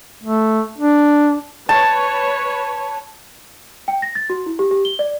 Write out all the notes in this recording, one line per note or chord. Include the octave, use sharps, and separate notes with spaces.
A3
D4
B4 C#5 A5
G5
A#6
A6
F#4
E4
G4
G4
G7
D5